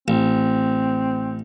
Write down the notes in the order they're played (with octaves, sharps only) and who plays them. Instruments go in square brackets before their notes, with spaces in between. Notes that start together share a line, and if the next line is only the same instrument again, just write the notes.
[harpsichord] A1 [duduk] C4